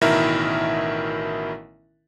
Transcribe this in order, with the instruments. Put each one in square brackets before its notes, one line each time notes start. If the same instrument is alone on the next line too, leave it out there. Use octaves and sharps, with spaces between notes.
[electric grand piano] A1 B2 D#3 E4 A#4 E5